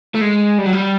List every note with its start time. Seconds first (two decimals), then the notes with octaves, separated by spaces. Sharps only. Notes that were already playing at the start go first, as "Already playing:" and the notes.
0.15 A3
0.21 G#3
0.58 G3
0.66 F#3
0.73 G3